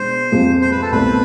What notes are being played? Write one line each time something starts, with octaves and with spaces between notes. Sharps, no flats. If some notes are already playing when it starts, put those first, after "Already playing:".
Already playing: B2 G#3 D4 C5
F2 C3 G#3 C4 F4
C5
B4
A4
C2 B2 A3 C4 B4